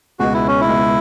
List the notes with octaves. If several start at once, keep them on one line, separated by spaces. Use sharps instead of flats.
C#2 B2 G#3 F#4
E4
C#4
E4
C#2 B2 G#3